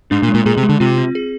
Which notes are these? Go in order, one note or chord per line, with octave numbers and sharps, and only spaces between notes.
G#2 D4
A#2
G#3
A#2
A#2 G#4
C3
G#3
D3
C3 F4
C4
G#4